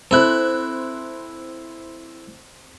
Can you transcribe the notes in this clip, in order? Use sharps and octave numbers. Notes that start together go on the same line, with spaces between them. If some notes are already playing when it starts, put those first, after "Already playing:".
C4 E4 A4 F#6